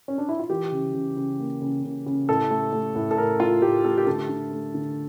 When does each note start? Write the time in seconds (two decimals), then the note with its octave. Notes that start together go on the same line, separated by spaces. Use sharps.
0.08 C#4
0.18 D4
0.29 E4
0.39 F4
0.50 E3 G4
0.72 C#3
0.94 C#3
1.17 C#3
1.40 A#3
1.62 C#3
1.84 C#3
2.06 C#3
2.29 A2 A4
2.51 A3
2.73 A3
2.95 A2
3.11 A4
3.17 A2 A#4
3.39 A3 F4
3.62 A2 G4
3.85 A3 A4
3.98 G4
4.07 D3 A4
4.29 D3
4.51 A3
4.74 D3